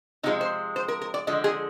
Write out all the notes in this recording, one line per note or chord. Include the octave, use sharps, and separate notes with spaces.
C3 F3 G#3 D#4
C5
C5
A#4
A#4
D5
D3 F3 G#3 D#5
G#4